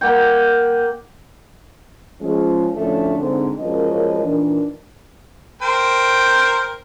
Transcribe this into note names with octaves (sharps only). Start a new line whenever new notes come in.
A#3 F#5 G5
F3 G#3 C#4
D2 A2 F3 A3 C#4 D4
G#2 D3 C4
F#2 F3 G#3 A#3 C#4 D#5
A#2 D#3 E3 D4
A#4 C5 G5